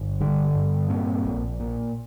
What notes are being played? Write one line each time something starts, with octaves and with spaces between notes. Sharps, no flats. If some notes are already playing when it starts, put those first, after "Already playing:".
Already playing: G1
D3 G3
G2
A#2 C4
A#1
A#2